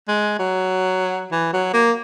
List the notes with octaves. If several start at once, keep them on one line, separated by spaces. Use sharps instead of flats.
G#3
F#3
E3
F#3
A#3